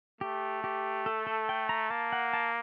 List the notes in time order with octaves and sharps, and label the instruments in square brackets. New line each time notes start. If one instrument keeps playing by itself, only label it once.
[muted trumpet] A3 [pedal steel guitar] G4
[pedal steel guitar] G4
A4
A4
G5
A#5
[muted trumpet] A#3 [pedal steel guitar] A5
[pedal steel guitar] F#5
A5